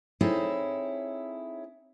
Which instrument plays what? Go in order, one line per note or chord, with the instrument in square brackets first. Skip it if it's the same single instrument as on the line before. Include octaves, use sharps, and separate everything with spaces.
[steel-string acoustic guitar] C4 D#4 E4 G#4 A4 C#5